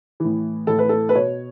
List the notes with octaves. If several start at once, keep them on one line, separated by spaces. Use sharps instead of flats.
A2 E3
A2 E3 A4
B4
A4
B4
B2 C#5